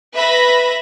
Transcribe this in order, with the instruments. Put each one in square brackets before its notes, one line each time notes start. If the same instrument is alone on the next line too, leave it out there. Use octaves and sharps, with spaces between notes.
[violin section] B4 E5 B5 A#6